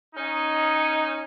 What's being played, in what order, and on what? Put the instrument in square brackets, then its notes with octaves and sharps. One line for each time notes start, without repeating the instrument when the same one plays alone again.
[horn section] C#4 D#4